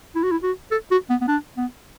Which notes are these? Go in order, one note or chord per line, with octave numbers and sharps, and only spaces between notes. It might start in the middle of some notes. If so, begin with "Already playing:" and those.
E4
F#4
E4
F#4
A4
F#4
B3
B3
D4
B3